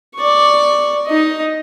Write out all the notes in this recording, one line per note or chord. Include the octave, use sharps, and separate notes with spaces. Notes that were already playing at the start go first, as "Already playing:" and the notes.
D5 C#6
D#4 D#5